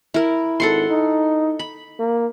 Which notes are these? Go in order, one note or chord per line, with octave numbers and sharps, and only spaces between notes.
E4 A#4
G#1 A4 F#5 C6
D#4
B5
A#3